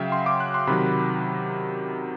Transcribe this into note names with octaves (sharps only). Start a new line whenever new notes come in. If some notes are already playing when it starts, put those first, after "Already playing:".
Already playing: C#3 F#3 E5 F5 G5
C6
D6
F#6
C6
C3 D#3 F#3 B5